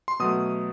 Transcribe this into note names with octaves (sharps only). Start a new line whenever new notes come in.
C6
B2 F#3 A3 D#6